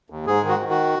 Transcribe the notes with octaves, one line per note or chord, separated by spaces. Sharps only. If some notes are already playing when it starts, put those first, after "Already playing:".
D#2
G#2 G#4
D#3
F#4
D#3
F#4